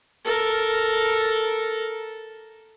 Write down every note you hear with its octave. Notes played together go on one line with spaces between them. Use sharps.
A4 A#4